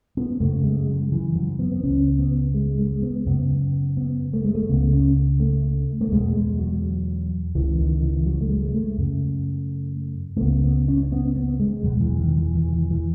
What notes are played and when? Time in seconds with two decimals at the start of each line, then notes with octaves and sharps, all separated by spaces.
0.17 B3
0.40 F#2 C#3 A3
0.64 G#3
0.88 F#3
1.12 E3
1.36 F#3
1.59 B3
1.72 B3
1.83 C#2 C#3 C#4
2.19 B3
2.54 G#3
2.79 G#3
3.02 B3
3.26 F#2 C#3 B3
3.97 B3
4.33 A3
4.45 G#3
4.55 A3
4.69 C#2 C#3 B3
4.93 C#4
5.40 A3
6.01 A3
6.12 E2 B2 G#3
6.36 G#3
6.59 F#3
7.55 C#2 C#3 E3
7.79 D#3
8.03 E3
8.26 F#3
8.41 A3
8.49 G#3
8.66 G#3
8.74 A3
8.98 F#2 C#3
10.37 A3
10.41 C#2 C#3 B3
10.64 B3
10.88 C#4
11.03 C#4
11.12 B3
11.36 B3
11.60 G#3
11.83 E2 B2 F#3
12.01 E3
12.19 D#3
12.38 E3
12.55 E3
12.73 E3
12.91 E3